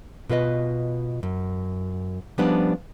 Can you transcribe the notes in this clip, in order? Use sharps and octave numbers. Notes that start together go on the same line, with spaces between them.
B2 F4 B4 D#5
F#2
F3 G3 B3 C#4 D4